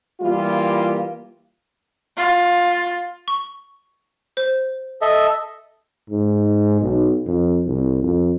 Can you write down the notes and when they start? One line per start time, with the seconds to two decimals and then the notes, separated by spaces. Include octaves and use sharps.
0.21 E3 G3 A#3 F4
2.17 F4
3.28 C#6
4.37 C5
5.02 A4 D#5 E5
6.10 G#2
6.81 B1
7.26 F2
7.67 C2
8.03 F2